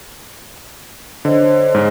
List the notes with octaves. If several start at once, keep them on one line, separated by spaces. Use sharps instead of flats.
D3 C5 C#5 D#5
G#2 G#3